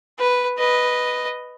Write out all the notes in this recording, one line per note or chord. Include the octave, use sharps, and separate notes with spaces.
B4
B4 D#5